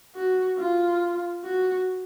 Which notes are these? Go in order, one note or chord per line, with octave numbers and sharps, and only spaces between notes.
F#4
F4
F#4